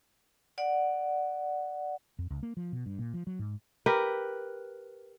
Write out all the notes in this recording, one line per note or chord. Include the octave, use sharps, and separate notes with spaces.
D5 F#5
F2
C#2
A#3
F3
B2
G2
A#2
F3
F#3
G#2
G4 A#4 B4